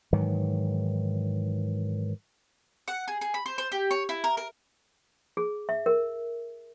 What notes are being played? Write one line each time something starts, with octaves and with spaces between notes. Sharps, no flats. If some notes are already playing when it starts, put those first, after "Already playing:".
G#2 D#3 E3 F#3
F#5
G#4
G#4
B5
C5
C5
G4
C#5
E4
A#4
A#4
G#4
E5
A#4